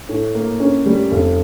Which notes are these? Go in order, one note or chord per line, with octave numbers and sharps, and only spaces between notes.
A2
A#3
C#4
G3
F1